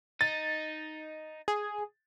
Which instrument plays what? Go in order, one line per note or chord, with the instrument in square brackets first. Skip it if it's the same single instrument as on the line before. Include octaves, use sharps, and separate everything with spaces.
[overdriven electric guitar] D#4 [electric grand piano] A6
[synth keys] G#4